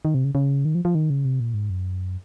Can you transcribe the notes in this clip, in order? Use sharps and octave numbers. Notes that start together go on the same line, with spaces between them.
D#3
C3
C#3
C#3
D#3
F3
F3
D#3
C#3
C3
A#2
G#2
F#2